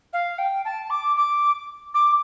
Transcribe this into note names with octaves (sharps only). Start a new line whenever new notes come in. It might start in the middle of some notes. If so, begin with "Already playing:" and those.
F5
G5
A5
D6
D6
D6